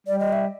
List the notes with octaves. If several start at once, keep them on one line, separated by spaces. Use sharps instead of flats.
G3 D5
D#5
E5